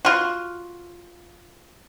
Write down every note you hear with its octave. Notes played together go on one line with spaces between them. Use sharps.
F4 F#4